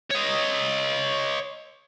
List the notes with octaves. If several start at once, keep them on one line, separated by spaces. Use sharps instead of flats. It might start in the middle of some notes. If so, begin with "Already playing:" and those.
C#5 D#5